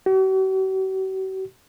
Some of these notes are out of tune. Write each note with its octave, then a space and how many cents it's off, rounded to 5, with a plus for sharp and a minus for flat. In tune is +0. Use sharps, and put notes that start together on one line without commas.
F#4 +45